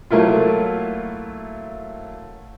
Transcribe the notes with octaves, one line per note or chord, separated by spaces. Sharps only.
F#3 A3 A#3 E4 F4